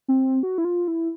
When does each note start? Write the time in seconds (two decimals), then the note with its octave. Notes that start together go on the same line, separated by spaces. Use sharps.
0.08 C4
0.43 F#4
0.58 E4
0.65 F4
0.88 E4